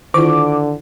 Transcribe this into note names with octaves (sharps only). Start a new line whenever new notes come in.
D3 D#3 E4 F4 D6